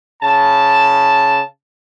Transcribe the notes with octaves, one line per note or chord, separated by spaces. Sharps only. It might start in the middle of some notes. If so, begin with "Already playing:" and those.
C#3 A5